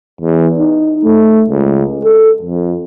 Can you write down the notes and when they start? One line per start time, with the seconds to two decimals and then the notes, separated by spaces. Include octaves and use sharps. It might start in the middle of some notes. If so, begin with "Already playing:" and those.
0.21 E2
0.58 D#4
1.05 A3
1.50 C#2
2.04 A4
2.42 F2